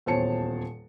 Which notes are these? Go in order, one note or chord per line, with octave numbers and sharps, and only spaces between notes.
D#1 E2 C5 C#5 A5 C#7